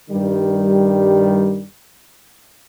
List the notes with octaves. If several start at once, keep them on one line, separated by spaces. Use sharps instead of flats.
G2 D#3 G3